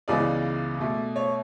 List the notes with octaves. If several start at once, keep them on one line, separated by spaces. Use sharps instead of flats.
C#2 C#3 E3 G#3 B3 D5
B2 A3
C#5